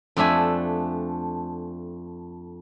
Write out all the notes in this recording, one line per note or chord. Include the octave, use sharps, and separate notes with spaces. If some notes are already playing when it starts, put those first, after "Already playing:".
F2 A3 D4 E5 G#5